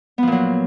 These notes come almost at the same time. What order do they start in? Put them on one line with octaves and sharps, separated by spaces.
B3 F3 A#2 F#3